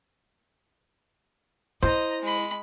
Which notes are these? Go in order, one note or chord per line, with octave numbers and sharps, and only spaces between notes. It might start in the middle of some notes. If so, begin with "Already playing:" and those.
E4 C5 D#5 A#5
G#3 B5